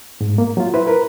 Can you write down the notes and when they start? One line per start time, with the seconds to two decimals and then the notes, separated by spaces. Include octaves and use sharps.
0.21 G#2
0.38 A#3
0.57 F#3 F4
0.74 E4 B4 C5
0.87 A#4 B4